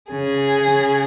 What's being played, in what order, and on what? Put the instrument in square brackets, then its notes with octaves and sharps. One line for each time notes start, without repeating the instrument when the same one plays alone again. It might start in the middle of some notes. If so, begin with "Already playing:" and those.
[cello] C#3 [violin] G#4
[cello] C#3